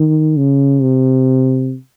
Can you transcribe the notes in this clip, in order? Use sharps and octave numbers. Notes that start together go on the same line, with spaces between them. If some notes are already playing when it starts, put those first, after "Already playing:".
Already playing: D#3
C#3
C3